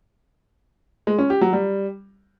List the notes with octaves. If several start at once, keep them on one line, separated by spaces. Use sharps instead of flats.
G#3
C#4
G4
F#3
G3